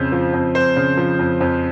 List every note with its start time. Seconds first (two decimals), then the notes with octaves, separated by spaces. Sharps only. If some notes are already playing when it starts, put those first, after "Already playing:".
Already playing: F2 C#3 C5
0.12 F3
0.34 F2
0.55 F2 C5
0.76 C#3
0.97 F3
1.19 F2
1.41 F2